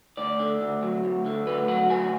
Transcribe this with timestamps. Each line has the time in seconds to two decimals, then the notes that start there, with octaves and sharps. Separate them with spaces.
0.17 D2 D5
0.40 D3
0.61 D2
0.83 F#3
1.04 D2
1.26 D3
1.47 D2 B4
1.68 F#3 F#5
1.90 D2 G#5